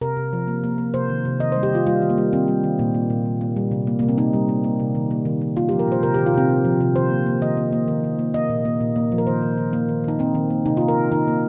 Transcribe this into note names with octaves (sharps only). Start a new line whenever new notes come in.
C3 A#4
C3
F3
A#3
A#3
A#3
C3 C5
D#3
C3
D#3 D#5
C5
G3
G4
D#3 F4
G3 F4
D#3
A#3
G3
D#3 C4
G3
D#3
A#2
A#3
A#2
G3
A#3
G3
C3
A#3
C3 A#3
C4
A#3 D#4
G3
A#3
A#3
C3
D#3
A#3
D#3
D#3
A#3 F4
G4
F3
A#4
A#2 C5
C3 A#4
G4
D#3
F4
C3 C4
C3
F3
C3
D#3 C5
A#3
A#3
D#3 D#5
A#3
A#3
D#3
D#3
A#3
A#3 D#5
A#2
A#3
A#2
A#3
F3
A#4
D#3 C5
D#3
D#3
A#3
D#3
D#3 D#4
A#3 C4
D#3
A#3
C3 D#4
F4
A#3
A#4
C3
D#3 D#4
A#3